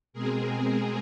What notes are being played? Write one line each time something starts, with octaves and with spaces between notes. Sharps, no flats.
B2 G#3 C4 G#4 A#4